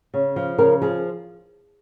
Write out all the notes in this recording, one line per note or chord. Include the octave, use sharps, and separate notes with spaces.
C#3
F3
C#3 A#4
F3 G#4